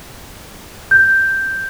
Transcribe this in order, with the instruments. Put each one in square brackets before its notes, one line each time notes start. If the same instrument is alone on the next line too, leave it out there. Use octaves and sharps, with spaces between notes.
[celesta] G6